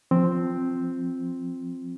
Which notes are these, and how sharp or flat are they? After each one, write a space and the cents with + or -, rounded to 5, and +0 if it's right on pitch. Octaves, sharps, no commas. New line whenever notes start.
F3 +0 C4 +0